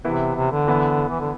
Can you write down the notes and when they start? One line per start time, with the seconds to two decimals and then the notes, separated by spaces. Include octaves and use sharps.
0.04 C3 E3 B3 E4
0.36 C3
0.52 D3
0.67 E3 B3 E4
1.09 E3
1.20 D3